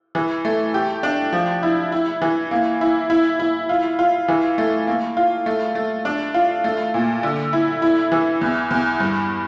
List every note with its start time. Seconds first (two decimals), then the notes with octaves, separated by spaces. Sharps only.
0.15 E3
0.45 A3
0.74 G4
1.03 D4
1.32 F3
1.63 E4
1.92 E4
2.22 E3
2.51 A#3
2.81 E4
3.10 E4
3.39 E4
3.69 F4
3.99 F4
4.28 E3
4.58 A3
4.87 A#3
5.17 F4
5.46 A3
5.75 A3
6.05 D4
6.34 F4
6.64 A3
6.94 A#2
7.23 D3
7.53 E4
7.82 E4
8.12 E3
8.41 E2
8.71 E2
9.00 G2